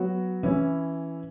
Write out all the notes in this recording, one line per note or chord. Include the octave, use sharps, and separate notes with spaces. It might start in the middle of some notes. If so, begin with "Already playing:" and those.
Already playing: F#3 B3 F#4
E3 C#4 E4